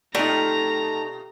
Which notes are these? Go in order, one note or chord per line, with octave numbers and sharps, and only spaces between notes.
B2 A3 D#4 F4 G4 D5 A#5